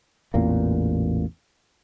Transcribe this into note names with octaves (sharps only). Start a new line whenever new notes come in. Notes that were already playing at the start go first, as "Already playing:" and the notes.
A1 E2 A#2 A#3